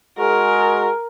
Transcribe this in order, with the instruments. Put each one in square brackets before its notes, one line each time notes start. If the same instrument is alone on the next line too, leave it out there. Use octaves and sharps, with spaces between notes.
[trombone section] G#3 F#4 G#4 [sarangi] A#4